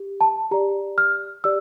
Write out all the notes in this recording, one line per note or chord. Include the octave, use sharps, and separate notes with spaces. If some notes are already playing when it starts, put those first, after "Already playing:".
Already playing: G4
A5
G4 D5 A#5
F6
G4 D5 E6